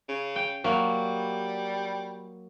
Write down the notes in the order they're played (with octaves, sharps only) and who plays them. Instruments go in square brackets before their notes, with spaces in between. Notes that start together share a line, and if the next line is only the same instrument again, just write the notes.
[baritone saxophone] C#3
[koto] G5
[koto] F#3 A#3 [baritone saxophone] G3